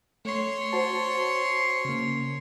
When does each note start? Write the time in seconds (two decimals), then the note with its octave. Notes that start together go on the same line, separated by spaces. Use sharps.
0.25 A3 C#5 C6
0.73 F#4 C5 A5
1.85 C#3 A#3